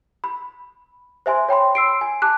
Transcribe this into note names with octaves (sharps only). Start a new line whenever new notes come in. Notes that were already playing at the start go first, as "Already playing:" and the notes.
B5
C5 E5 G#5 C6
C#5 G5 B5 C6
C6 E6 C7 D7
G#5
A5 D6 F#6